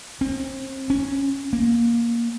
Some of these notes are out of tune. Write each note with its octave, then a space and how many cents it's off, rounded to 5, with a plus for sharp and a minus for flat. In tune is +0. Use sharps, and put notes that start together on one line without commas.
C4 +35
C#4 -10
A#3 +10